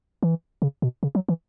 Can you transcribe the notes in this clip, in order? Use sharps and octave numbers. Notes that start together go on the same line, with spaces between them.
E3
C#3
B2
C#3
F#3
E3